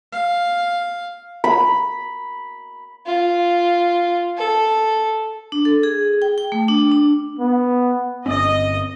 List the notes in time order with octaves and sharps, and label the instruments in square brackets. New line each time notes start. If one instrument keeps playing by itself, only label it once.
[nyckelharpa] F5
[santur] B5
[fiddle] F4
A4
[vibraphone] D4
A4
G#4
G5
G5
A3
D4
D4
[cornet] B3
[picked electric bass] G1 C4 C#4 [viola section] D#5